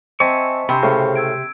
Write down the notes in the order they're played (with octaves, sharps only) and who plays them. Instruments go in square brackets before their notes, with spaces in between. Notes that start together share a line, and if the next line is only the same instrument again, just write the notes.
[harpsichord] C4 [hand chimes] C5 D#5 A5 [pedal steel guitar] E5 G#5 C#6
[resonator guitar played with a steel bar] C3 [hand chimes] B5
[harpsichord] A2 C#3 [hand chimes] G#4 C5
[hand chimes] E6 G#6 D7